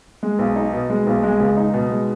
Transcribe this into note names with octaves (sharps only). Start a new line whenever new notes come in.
G#3
B1
D#4
B2
G#3
B1
G#3
C#2
D#4
B2
G#3